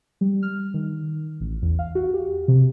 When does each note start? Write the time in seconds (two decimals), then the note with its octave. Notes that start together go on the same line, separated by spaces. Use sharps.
0.21 G3
0.43 F6
0.74 D#3
1.40 A1
1.62 E2
1.79 F5
1.95 F#4
2.14 G4
2.48 C3